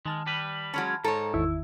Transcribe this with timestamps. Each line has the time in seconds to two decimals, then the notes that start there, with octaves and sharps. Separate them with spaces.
0.06 D#3 G#3 A5 F6
0.27 G3 B4
0.74 F#3 G#3 C#4 A5 B5 F6
1.04 G#2 A4 C#5 A#5
1.34 G#1 E2 D#3 E4